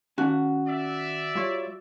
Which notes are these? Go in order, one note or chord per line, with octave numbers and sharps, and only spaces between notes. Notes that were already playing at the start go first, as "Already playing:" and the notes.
D#3 C#4 F#4 A5
D5 E5
G3 F4 C#5